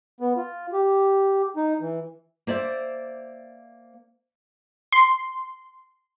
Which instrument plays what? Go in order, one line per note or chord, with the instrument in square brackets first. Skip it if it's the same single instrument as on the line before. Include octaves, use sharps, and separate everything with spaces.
[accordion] B3
F4
G4
D#4
E3
[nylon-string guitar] A#3 C5 D5 E5
[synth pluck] C6